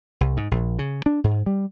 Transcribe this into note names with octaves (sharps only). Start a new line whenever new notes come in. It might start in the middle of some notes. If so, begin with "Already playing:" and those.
C2
G#2
A#1
C#3
D4
G#2
G3